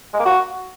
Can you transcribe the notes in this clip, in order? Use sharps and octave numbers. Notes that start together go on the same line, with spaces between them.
G#3
A#3
F#4